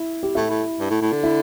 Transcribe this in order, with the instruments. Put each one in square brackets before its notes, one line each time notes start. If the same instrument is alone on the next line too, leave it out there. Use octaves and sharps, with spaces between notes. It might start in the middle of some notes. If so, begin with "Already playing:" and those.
Already playing: [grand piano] E4
G4
[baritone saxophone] A2 [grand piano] E4
[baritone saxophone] A2
G2
A2
A2
D3
[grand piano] E4